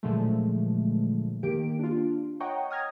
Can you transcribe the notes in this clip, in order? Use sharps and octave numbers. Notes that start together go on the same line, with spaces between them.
A#2 D3 F3 F#3 G#3 A3
D#3 A#3 G4 D7
D4 F4
C#5 D#5 F#5 G5 A#5 C#6
D#6 F6 G#6 A#6